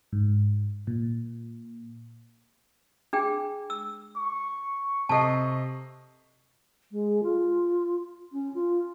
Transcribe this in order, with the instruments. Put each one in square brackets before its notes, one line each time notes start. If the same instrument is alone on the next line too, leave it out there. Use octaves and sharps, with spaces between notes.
[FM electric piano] G#2
A#2
[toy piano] D4 G#4 G5
E6
[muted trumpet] C#6
[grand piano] C3 D#5 C7 [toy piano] A4 A5
[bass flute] G#3
F4
C#4
F4